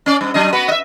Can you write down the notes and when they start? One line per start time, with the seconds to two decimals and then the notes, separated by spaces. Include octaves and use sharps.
0.06 C#4 D5
0.21 G2
0.34 F#3 D4 D#5
0.53 B3 F#4 B4
0.68 D#5 E5